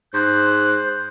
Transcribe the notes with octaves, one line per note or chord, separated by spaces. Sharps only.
G#2 C5 F#6